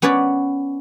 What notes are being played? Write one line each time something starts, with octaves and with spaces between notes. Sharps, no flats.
B3 C#4 B4 C#5 D5